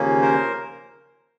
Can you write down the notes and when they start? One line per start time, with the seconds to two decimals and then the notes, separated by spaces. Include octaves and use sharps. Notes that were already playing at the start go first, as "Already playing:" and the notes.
Already playing: D#2 C#3 F3 A#3 C#4
0.22 A#4 C5